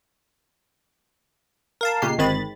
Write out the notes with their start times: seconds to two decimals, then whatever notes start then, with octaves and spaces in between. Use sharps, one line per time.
1.81 A#4 F5 A5
2.02 A#2 C#3 G#3 G4 C7
2.18 G1 D#3 G#3 C4 B5 A6